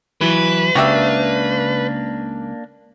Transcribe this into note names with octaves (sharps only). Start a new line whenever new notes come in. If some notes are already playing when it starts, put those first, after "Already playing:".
E3 F#3 E4 B4
C#2 C#3 A#3 D4 F#4 G4 E5